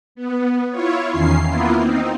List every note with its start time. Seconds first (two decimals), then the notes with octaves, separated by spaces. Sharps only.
0.15 B3
0.70 E4 F4 C#5
1.12 E2 D#3 C#4 C7
1.47 A#3 B3 E4 F4
1.76 C4 D#4